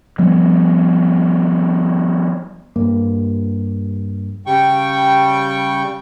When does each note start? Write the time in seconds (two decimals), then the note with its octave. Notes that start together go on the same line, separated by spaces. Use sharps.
0.19 F3 G3 B3
2.76 G2 A#3
4.46 C#3 G3 G5 C#6